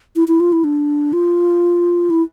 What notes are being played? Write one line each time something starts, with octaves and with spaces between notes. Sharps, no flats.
E4
E4
F4
E4
D4
F4
E4